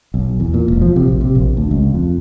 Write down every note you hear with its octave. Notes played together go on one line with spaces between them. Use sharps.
B1
E2
A#2
E1
F3
C3
A#1
C3
A#1
D2
C#2
F2